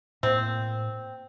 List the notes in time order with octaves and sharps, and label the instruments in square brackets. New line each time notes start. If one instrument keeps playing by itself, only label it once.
[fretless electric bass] A2 A#3 [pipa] C4